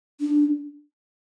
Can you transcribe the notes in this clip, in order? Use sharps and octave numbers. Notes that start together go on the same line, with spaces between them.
D4